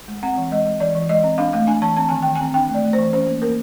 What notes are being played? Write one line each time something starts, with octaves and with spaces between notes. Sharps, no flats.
G#3
C4 F#5
E3
G#3 D#5
G#3
E3 D5
E3
G#3 D#5
C4
D4 F5
A3 F5
D4 G#5
E3 A5
C4 A5
D#3 G#5
D#3 G5
G#5
C4
D4 G5
A3
D5
A3
C5
E3
C#4 C5
A#3
A#3 A#4